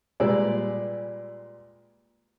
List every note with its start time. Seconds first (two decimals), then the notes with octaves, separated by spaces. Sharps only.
0.20 A#2 G3 G#3 B4 D5 E6